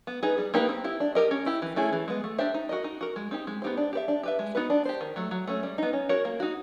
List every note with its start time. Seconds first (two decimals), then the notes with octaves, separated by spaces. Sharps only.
0.07 B3
0.23 D#4 G#4 B4
0.38 G3
0.54 A#3 D#4 G4 B4
0.69 C4
0.84 E4 G4
1.00 D4
1.15 G4 A#4 D#5
1.31 C#4
1.46 E4 G4
1.62 E3
1.76 A3 C#4 E4 G#4
1.93 E3
2.08 G#3 B3
2.24 A3
2.38 D4 G4 C5 E5
2.54 D#4
2.69 F#4 A#4 D#5
2.84 D#4
3.01 F#4 A#4
3.16 G#3
3.31 C4 D#4 G4
3.47 G#3
3.62 B3 D#4 G4 C5
3.77 D4
3.93 G4 B4 E5
4.08 D4
4.23 G4 B4 E5
4.39 G#3
4.55 B3 D#4 F#4 B4
4.70 D4
4.85 G4 C5
5.01 D#3
5.16 F#3 A3
5.31 F#3
5.47 A3 C#4
5.63 G3
5.78 B3 D#4
5.93 C#4
6.09 F#4 A#4 C#5
6.25 A#3
6.40 D#4 F#4